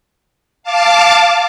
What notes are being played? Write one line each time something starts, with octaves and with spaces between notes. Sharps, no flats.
F5 A5 D6